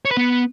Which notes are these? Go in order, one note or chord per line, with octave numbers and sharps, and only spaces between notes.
C#5
B4
B3